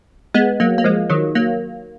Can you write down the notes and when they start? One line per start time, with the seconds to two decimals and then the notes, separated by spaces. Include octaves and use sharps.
0.34 G#3 B3
0.60 F#3 A#3
0.78 A#3
0.84 F3 G#3
1.10 D#3 F#3
1.35 F#3 A#3